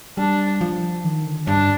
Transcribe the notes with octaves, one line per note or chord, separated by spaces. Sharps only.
G3 D4
F3
D#3
D3
G2 D4